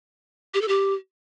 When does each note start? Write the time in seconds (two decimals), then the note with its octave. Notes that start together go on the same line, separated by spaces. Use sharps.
0.54 G4
0.61 A4
0.68 G4